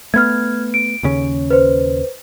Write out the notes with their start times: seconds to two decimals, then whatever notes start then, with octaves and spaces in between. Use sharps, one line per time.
0.14 A3 B3 F6 G#6
0.74 D7
1.03 D#2 C#3 C#4
1.51 B4 C5